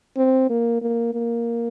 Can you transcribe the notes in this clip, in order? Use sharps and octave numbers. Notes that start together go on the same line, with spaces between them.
C4
A#3
A#3
A#3